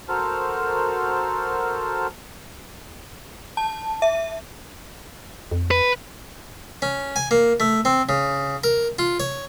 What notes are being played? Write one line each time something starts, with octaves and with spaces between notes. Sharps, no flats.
F#4 A4 A#4 C5 A5 F6
A5
E5
F2
B4
C#4
G#5
A#3
A3
C4
C#3
A#4
F4
C#5